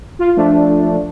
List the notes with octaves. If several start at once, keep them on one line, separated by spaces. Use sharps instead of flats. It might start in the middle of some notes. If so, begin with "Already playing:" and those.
F4
F3 A3 D4